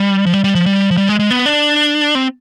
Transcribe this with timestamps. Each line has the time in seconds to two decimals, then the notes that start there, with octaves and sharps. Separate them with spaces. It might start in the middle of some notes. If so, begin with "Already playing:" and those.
Already playing: G3
0.26 F3
0.33 G3
0.44 G3
0.55 F3
0.66 G3
0.91 F3
0.97 G3
1.09 G#3
1.19 G#3
1.30 B3
1.46 D4
2.15 C4